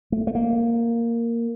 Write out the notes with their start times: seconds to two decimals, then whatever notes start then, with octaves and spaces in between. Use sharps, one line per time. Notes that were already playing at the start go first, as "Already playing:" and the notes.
0.12 A3
0.27 A3
0.35 A#3